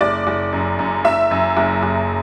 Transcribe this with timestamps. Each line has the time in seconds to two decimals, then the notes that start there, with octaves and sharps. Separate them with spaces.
0.01 F#1 D5 D6
0.27 F#1
0.52 F#2
0.79 F#2
1.04 F#1 E5 E6
1.31 F#2
1.57 F#1
1.83 F#1